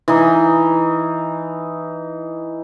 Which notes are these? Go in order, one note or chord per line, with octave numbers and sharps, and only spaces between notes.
E3 D#4